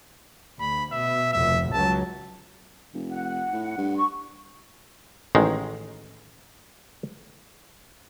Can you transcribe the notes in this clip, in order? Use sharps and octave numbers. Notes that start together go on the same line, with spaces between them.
D2 B5
B2 E5
F1 D2 E5
C#2 F#3 A5
F1
F#5
A2
G2
C#6
A1 D#3 G#3